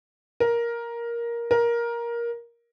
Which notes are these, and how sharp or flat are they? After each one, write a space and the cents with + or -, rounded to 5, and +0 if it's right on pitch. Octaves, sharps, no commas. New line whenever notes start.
A#4 +10
A#4 +15